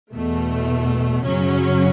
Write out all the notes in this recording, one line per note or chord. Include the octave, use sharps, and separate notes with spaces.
E2 B2 A3
F#2 C#3 F#3 C#4